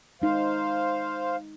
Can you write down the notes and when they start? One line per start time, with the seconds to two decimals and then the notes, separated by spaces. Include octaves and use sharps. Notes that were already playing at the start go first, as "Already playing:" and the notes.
0.22 G#3 D#4 C5 F5